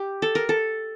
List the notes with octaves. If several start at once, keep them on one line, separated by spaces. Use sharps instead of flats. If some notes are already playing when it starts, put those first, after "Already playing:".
Already playing: G4
A4
A#4
A4